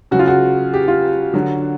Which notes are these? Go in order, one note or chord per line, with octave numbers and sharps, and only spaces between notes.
C#3 F#3 F#4
F4
F#4
G4
F4
D3 F#3 F#4